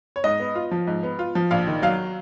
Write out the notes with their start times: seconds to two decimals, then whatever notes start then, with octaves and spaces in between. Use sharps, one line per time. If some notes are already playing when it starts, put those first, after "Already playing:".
0.16 C#5
0.24 G#2 D#5
0.40 B3
0.55 F4
0.71 F3
0.87 G#2
1.03 B3
1.19 F4
1.35 F3
1.51 A#1 F5
1.67 D#3
1.82 F#3 F5